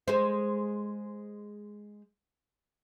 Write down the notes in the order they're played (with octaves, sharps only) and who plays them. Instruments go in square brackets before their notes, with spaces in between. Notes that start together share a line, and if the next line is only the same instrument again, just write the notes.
[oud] G#3 C5